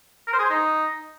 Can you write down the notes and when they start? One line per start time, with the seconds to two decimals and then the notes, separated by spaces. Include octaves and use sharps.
0.27 A#4
0.33 C5
0.39 G#4
0.44 C5
0.50 D#4